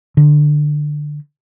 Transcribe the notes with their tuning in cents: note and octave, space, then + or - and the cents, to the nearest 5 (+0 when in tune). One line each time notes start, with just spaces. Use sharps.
D3 +15